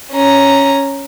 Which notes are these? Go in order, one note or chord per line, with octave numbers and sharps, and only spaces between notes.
C#4 A#5